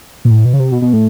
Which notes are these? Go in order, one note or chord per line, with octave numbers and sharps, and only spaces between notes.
A#2
A2
B2
C#3
C3
B2
B2
A2